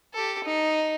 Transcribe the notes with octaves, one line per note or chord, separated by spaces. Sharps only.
G4 A4
D#4